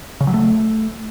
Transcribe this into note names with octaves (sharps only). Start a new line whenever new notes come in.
C#3
F#3
A3